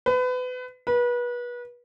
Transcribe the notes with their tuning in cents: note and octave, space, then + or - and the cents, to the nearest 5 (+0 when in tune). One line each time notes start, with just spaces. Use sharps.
B4 +30
B4 -30